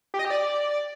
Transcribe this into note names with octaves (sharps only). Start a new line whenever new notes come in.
G4
D#5
G4
D5